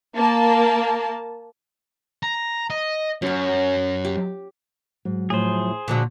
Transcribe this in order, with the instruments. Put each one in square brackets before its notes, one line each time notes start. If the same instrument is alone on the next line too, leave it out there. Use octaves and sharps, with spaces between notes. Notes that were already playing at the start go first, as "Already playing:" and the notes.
[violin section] A#3 A5
[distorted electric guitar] A#5
D#5
[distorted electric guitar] F#2 [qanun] F#3 C#4
[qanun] G4
[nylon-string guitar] G#2 [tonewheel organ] F#3
[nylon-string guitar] A2 F3 [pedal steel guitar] G#4 C5
[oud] A#2 D3 F#3 [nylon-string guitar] F3